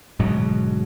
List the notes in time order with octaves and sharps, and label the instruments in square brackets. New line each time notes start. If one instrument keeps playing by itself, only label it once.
[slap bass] D1 G#2 B2 F#3